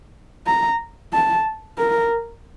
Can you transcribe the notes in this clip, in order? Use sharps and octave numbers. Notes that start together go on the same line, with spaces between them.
A#5
A5
A#4